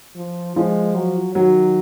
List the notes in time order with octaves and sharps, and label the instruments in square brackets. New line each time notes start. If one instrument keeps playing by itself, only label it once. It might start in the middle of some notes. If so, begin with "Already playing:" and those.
[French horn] F3
[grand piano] F3 [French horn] G#3
[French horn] F#3
[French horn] D#3 [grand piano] F#3